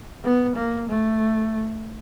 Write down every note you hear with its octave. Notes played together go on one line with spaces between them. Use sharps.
B3
A#3
A3